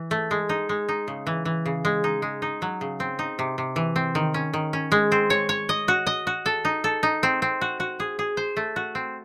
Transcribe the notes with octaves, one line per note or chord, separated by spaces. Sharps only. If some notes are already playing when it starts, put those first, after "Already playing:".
Already playing: E3
A3
G#3
D#4
G#3
D#4
C#3
E3
E3
C#3
G#3
D#4
G#3
D#4
F#3
C#3
C4
D#4
C3
C3
E3
C4
D#3
C#4
D#3
C#4
G#3
C4
C#5
C#5
D#5
F#4
D#5
F#4
A4
D#4
A4
D#4
C4
C4
F#4
F#4
G#4
G#4
C5
A3
F#4
C4